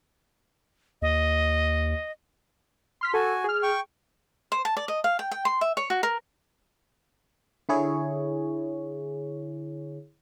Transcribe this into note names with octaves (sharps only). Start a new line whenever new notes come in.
D#2 D#5
C6 F6 B6
F#4 A4 G#5
G#4 F6
G5 C#6
C5
A5
D5
D#5
F5
G5
G5
C6
E5
C#5
F#4
A#4
D3 E4 G#4 C#5